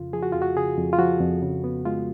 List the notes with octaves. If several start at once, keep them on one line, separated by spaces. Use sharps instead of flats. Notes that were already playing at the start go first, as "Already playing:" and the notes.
Already playing: F2 C#3 F4
F3 G#4
F#4
F2 F4
F#4
C#3 G#4
F2
F4
F3 F#4
F2
C#3
B3
G#3 F4